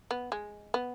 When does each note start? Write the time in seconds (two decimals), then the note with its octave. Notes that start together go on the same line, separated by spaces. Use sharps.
0.11 B3
0.32 G#3
0.74 B3